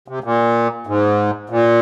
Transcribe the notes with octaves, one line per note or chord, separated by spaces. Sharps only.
C3
A#2
G#2
A#2